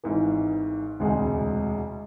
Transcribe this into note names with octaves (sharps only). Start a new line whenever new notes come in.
G#1 G#2 E3
E1 D2 C3 G#3